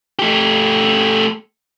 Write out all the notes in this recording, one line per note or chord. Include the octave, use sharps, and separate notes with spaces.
A3 G4